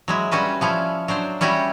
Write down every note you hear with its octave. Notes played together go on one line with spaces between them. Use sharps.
F#3 G#3 E4
G3 C#4 F#4 B4
F3 C#4 E4
F#3 D4 C5
G3 C#4 E4 F#4 G4